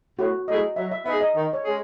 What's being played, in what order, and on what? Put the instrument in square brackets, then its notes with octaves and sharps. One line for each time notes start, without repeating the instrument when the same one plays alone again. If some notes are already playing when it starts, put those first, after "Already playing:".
[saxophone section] A2 [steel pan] F#4
[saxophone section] F#3 A3 E4 G#4 [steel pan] D#5
[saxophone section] F#3 [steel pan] E5
[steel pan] E5
[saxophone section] B3 D#4 G#4 [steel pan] E5
[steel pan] D#5
[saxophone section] D#3 [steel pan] D#5
[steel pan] C#5
[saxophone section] G#3 C#4 G#4